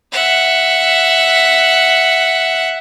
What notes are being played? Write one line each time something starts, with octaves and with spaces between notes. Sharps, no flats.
E5 F#5